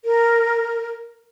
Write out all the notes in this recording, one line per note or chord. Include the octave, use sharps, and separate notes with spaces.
A#4